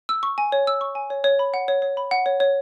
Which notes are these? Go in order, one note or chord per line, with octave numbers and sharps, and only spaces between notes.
E6
C#6
G#5
C#5
E6
C#6
G#5
C#5
C#5
B5
F#5
C#5
C#5
B5
F#5
C#5
C#5